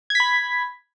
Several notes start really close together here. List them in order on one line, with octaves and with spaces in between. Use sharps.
G#6 B6 B5